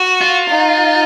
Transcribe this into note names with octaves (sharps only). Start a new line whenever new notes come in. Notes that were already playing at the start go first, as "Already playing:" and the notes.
Already playing: F#4
F4
D#4